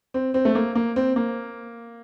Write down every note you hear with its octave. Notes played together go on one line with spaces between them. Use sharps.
C4
C4
A3
A#3
A#3
C4
A#3